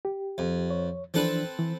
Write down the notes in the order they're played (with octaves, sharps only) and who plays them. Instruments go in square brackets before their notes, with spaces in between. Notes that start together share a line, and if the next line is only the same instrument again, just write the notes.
[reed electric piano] G4
[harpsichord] F2
[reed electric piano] C#5
[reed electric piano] E3 F3 D4 [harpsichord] C4 A4 B4
[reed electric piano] E3